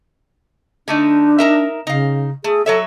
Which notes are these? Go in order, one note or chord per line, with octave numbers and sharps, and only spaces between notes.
D3 A3 D4 D#4
D#4 A#4 E5
C#3 D#4 F5
A3 G#4
F#3 A4 C#5 E5